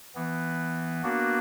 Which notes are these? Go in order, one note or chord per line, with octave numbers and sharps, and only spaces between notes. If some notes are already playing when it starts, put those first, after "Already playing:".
E3 B3
A#3 B3 D4 F#4